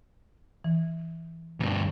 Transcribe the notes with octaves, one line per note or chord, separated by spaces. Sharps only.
E3
D2 G2